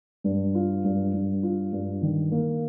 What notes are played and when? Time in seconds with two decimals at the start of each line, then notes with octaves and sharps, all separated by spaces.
0.24 G2
0.55 F4
0.84 G2
1.13 G2
1.43 F4
1.73 G2
2.02 D#3
2.31 A#3